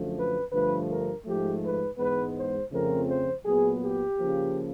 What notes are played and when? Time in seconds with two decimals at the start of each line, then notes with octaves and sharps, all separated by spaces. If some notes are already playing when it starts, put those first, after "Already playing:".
Already playing: F#2 D3 F3 A3
0.17 B4
0.52 G2 D3 F3 A3 B4
0.90 A#4
1.26 G#2 F3 A3 G4
1.62 B4
1.98 G#2 E3 G#3 B3 B4
2.36 C5
2.72 F2 C#3 F3 A3 C4 A#4
3.08 C5
3.45 A#2 F#3 B3 G#4
3.82 G4
4.18 C#3 F3 A#3